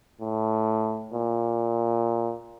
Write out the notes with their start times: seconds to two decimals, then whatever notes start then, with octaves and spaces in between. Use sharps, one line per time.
0.21 A2
1.13 A#2